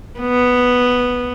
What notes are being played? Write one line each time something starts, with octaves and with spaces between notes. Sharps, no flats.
B3